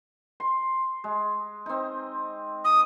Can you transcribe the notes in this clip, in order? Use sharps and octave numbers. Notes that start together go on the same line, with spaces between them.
C6
G#3
C4 D#4
D#6